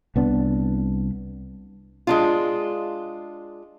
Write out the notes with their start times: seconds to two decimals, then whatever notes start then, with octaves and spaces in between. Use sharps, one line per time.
0.16 C2 B3 D4
2.07 G#3 D4 F4